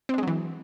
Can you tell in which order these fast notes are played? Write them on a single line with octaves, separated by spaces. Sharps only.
C4 D4 G#3 F#3 E3